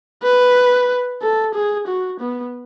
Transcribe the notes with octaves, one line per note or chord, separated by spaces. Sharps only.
B4
A4
G#4
F#4
B3